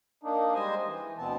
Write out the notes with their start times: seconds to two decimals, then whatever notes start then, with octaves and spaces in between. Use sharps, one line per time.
0.23 A#3 D4 D#4
0.54 G3 G#3 C5 D#5 G#5
0.87 E3
1.18 D2 B2 B3 C4 A5